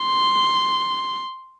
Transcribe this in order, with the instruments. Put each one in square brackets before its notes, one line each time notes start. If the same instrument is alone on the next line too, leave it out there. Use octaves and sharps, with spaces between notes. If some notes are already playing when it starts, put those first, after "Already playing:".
Already playing: [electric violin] C6